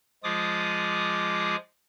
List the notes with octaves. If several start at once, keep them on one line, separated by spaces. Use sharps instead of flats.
F3 G#3 F4 G#4 D6 D#6